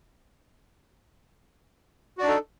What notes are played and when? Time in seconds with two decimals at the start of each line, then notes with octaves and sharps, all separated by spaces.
2.18 F#4
2.21 D5
2.23 D4
2.26 D#4
2.29 A4